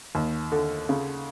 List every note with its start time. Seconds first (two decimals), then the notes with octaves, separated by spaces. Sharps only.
0.15 D#2
0.52 D3
0.89 C#3